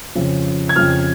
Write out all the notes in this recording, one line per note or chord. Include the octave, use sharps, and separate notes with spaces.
F2 C#3 F3
G#6
F2 C#3 F3 F6